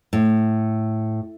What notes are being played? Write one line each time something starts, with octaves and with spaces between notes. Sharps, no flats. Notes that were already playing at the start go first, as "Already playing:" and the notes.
A2